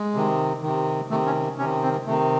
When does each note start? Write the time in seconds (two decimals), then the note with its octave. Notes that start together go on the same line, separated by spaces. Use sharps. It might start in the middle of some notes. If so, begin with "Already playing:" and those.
Already playing: G#3
0.14 C3 D#3
0.62 C3 D#3
1.10 C3 D#3 A3
1.26 C#4
1.58 C3 D#3 C#4
1.82 C4
2.06 C3 A3
2.09 D#3